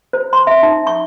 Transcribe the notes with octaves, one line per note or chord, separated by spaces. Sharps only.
C5
C6
E5
D#4
C#6